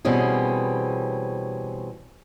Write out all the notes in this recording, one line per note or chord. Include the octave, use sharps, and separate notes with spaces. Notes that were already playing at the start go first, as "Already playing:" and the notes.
B2 E3 G3 C4 C#4 G#4